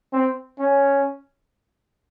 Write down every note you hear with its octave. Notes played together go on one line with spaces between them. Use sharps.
C4
C#4